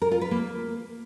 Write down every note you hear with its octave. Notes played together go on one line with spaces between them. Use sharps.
A#4
F4
B4
A#3